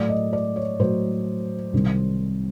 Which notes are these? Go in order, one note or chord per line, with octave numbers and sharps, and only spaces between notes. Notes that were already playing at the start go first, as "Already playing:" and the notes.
Already playing: A2 F#3 A3 D5
D#5
D5
C#5
A2 F#3 A3 C5
C2 C3 D#3 G3